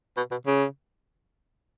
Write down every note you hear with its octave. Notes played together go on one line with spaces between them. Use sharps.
B2
B2
C#3